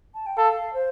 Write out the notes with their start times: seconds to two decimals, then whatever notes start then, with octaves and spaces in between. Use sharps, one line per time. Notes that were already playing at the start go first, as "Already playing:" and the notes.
0.14 A5
0.26 G5
0.37 A4 F5
0.74 C5